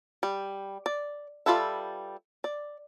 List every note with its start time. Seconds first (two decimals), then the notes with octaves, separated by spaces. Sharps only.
0.23 G3
0.86 D5
1.46 G3 F4 A4 B4 E5
2.44 D5